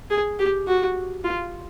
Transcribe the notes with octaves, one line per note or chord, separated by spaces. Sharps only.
G#4
G4
F#4
F4